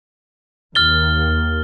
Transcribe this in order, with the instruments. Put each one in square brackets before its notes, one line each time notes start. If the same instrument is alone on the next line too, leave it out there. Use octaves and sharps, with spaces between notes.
[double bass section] D#2 [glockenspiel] F6 A6 G7